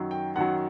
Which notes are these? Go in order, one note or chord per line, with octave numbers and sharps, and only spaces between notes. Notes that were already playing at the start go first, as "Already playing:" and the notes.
Already playing: F#2 D#3 F#3
G5
F#2 D#3 F#3 F#5